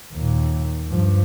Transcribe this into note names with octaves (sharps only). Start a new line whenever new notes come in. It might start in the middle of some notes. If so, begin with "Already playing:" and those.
D#2 A#2
G2 F3